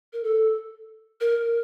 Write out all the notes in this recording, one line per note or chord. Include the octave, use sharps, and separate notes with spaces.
A#4
A4
A#4